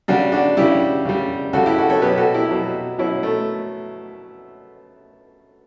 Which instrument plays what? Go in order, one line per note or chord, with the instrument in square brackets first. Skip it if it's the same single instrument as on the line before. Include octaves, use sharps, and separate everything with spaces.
[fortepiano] C#3 G3 D4 F#4
D4 F#4
C#3 G3 E4 G4
C#3 G3
C#3 G3 F#4 A4
E4 G4
F#4 A4
A4 C#5
B2 F#3 G4 B4
F#4 A4
E4 G4
B2 F#3
B2 F#3 C#4 E4
A3